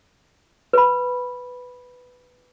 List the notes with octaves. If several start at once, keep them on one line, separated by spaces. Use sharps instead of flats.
B4 B5